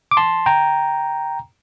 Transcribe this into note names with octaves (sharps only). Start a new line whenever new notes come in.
D6
A5 C6
G5 A#5